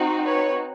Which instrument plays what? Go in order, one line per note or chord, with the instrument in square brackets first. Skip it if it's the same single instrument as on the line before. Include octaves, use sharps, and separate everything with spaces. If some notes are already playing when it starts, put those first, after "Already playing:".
Already playing: [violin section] C4 D#4 F#4
B4 C#5